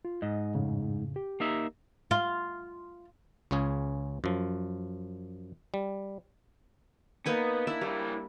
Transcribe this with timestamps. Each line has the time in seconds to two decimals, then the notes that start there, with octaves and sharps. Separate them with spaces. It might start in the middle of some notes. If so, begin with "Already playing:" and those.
0.05 F4
0.22 G#2 D#5
0.55 F2 A2 C#3
1.16 G4
1.40 A#3 D#4 E5
2.11 F4
3.51 C#2 C#3 C#4 G#4
4.24 F#2 F3
5.74 G3
7.26 A#3 B3 D#4 G#5
7.67 D4 E4 E5
7.81 G3 A#3 E4